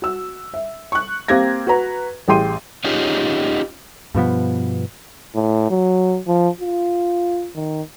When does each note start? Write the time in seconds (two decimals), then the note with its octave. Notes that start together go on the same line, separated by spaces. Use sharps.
0.02 F#4 E6
0.54 E5
0.92 C#6 F#6
1.28 A#3 C4 G4 F5 G#6 A#6
1.67 F#4 B4 A#5
2.28 A1 G4 G#4 G5 C6 D#7
2.84 C#4 D#4 F4 G4 G#4
4.15 G2 B2 F3 B3
5.36 A2
5.71 F#3
6.28 F3
6.61 F4
7.55 D#3